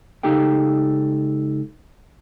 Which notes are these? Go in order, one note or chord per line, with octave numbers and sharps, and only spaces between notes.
C#2 D#4 G4 A4 G5